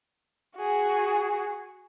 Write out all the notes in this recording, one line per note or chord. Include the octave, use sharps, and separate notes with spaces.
F#4 G#4